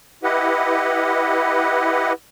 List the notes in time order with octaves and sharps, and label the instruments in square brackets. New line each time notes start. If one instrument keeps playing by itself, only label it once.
[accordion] E4 G4 B4 D#5 F#5